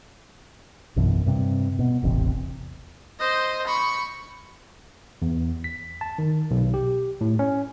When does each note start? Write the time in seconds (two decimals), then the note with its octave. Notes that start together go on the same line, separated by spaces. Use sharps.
0.96 A#1 F#2 B2 E3
1.26 G2 C3
1.79 B2
2.03 E1 A1 E2 C3
3.20 C5 D#5
3.67 B5 C#6
5.22 E2
5.64 B6
6.01 A5
6.18 D#3
6.51 B1
6.74 G4
7.21 A2
7.39 C#4